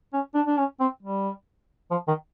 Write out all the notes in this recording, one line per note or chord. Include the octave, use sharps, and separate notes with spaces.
C#4
D4
D4
C#4
C4
G3
F3
D#3